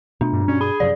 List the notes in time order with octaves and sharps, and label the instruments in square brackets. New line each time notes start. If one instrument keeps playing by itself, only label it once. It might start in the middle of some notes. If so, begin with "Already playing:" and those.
[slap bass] B2 A3 [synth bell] D4
[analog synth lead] G2
[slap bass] G2 B2 G3 [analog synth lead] C#4
[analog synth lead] G#4 [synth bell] B5
[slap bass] F#2 C3 F3 [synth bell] D5